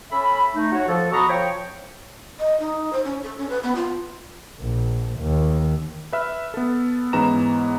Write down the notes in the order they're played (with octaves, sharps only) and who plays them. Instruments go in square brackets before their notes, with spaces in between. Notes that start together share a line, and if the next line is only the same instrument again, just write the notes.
[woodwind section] C#4 A4 E5 B5
A3 D#4
F#4 C#5
F3 A4
B2 F#4 A#5 B5 C#6 D#6
F3 C#5 G5
[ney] D#5
D#4
C5
C#4
A4
C#4
B4
B3
F4
[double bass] A#1
D#2
[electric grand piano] B4 E5 F6
B3 A4
G#2 E3 B3 C#4 A#5 E7